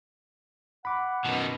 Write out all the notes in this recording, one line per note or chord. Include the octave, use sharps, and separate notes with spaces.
F#5 B5 D6
F#2 B2 D#3 B3 D#4